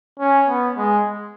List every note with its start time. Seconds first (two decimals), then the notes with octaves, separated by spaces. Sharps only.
0.20 C#4
0.48 B3
0.78 G#3